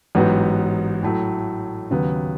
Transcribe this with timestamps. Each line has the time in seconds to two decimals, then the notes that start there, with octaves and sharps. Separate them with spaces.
0.15 A1 G#2 F#3 B3 F#4
1.03 A2 F#3 A3
1.91 D#2 C#3 F#3 B3